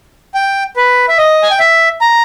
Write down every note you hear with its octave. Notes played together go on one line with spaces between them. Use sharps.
G5
B4
E5
D#5
G#5
G5
E5
A#5